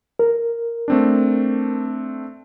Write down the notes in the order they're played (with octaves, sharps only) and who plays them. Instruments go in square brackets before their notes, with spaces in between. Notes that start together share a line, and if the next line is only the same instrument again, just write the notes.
[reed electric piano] A#4
[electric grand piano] A3 C4 D4